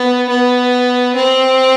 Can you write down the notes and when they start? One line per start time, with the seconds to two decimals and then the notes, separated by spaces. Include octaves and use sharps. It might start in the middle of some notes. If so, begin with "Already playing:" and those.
Already playing: B3
0.29 B3
1.16 C4